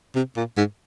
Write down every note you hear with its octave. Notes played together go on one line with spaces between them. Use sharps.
C3
A#2
G#2